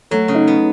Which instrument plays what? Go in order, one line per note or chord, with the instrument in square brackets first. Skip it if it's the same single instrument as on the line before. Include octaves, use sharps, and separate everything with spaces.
[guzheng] F#3 [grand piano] A3
[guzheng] C#3
[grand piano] D#4
[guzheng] B3